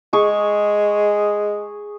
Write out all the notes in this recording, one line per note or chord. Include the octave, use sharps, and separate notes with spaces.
G#3 G#4 C#6